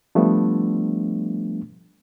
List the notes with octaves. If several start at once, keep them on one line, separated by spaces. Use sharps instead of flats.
F3 G3 A3 B3 D4